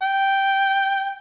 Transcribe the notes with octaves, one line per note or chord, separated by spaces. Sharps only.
G5